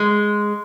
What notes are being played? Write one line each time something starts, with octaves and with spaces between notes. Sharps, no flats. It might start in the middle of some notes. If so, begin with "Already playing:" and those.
Already playing: G#3